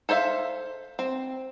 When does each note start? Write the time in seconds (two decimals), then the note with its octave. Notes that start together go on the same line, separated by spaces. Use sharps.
0.09 A4 C5 C#5 E5 F5
0.99 C4